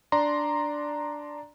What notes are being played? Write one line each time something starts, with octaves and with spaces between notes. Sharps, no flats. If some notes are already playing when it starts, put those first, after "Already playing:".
D4 D5 A#5 C6